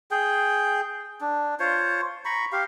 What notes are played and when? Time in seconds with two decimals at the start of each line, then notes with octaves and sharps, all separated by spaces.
0.11 G#4 G5
1.21 D4
1.60 F4 C5 C#5
2.25 A#5 B5 C#6
2.52 G4 F5